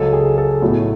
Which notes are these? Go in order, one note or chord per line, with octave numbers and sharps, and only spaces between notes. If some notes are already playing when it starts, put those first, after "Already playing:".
Already playing: C#2 C#3 F#3 A4
G#4
A4
B1 A2 F#3